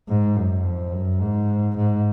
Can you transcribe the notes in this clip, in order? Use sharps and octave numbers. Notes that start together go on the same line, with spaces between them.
G#2
F#2
F2
F#2
G#2
G#2